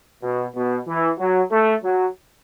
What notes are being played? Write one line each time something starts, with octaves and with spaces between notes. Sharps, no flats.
B2
B2
E3
F#3
A3
F#3